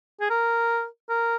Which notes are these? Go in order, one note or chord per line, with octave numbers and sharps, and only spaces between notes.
G#4
A#4
A#4